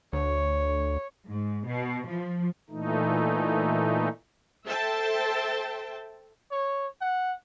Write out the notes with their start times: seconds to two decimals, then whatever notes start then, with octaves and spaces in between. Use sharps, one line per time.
0.13 D2 C#5
1.28 G#2
1.67 B2
2.06 F3
2.70 A#2 E3 A3 D#4
4.66 A4 C5 E5 G5 A5
6.52 C#5
7.01 F#5